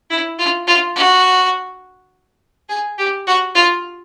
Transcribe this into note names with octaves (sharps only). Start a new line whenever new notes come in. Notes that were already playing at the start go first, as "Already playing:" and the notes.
E4
F4
F4
F#4
G#4
G4
F#4
F4